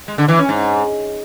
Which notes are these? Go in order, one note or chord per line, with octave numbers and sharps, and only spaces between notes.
G#3
D3
E3
C#4
G#2